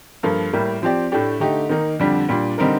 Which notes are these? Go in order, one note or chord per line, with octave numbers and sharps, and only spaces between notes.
G2 F3 A#3 F4 A4
A2 G3 A#3
F3 C4 G4 D5
A2 A3 D4 G4
D3 A3 D#4 G4
D#3 A#3 D#4
F2 D3 G3 D4
A#2 G3 D4
D3 G3 C4 D#4 A#4